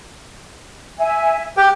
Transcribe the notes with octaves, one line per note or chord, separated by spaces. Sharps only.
E5 G#5
G4 G5 D6 F#6